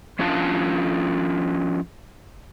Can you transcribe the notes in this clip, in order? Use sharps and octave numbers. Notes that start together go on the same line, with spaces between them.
F3 C#4 D4 F4 F5 A5